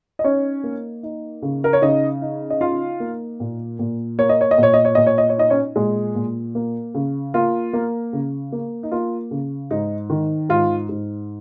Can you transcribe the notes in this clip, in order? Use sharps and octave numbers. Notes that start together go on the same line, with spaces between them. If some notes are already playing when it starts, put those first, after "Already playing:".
D#5
C#4 D#4 C#5
A#3
D#4
C#3
A#4
C#5
C#3 D#4 D#5
D#4
D#5
D#4 F4 F5
A#3
A#2
A#2
A#3 C#5
D#5
C#5
D#5
A#2 C#5
D#5
C#5
A#2 D#5
C#5
D#5
C#5
D#4 D#5
C#4 C#5
A#2 G#3 G#4
A#2
A#3
C#3
A#3 F4
A#3
C#3
A#3
D#4
A#3 F4
C#3
G#2 D#4
D#3
G#2 F4
G#2